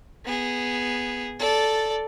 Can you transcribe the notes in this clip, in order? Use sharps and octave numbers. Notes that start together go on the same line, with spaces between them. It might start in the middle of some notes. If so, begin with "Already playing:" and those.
B3 G#4
A4 D5